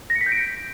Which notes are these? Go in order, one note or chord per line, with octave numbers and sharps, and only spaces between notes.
A#6
C#7
B6
G6
D7